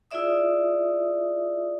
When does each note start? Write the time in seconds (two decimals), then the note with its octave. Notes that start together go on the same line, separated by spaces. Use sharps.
0.11 E4 F4 G#4 D5 E5 D#6